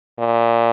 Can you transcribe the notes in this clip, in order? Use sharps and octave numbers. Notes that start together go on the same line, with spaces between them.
A#2